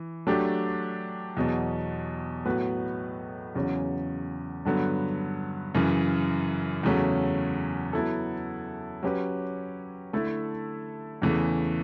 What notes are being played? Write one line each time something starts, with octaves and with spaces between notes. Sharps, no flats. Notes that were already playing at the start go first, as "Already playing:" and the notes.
Already playing: E3
F#3 A3 D4 G4
E2 B2 F#3
A2 F#3 B3 F#4 B4
E2 C#3 F#3 C#4
G2 D3 F#3 B3
F#2 C#3 E3
E2 C#3 F#3 A3 C#4
F#3 B3 E4 A4
F#3 C#4 G4 B4
D3 A3 E4 A4
E2 C#3 E3 A3